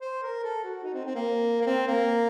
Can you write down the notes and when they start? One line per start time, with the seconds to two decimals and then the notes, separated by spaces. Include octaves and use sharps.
0.01 C5
0.23 A#4
0.43 A4
0.64 F#4
0.84 D#4
0.94 C4
1.05 C4
1.15 A#3
1.62 A#3
1.66 C4
1.87 A#3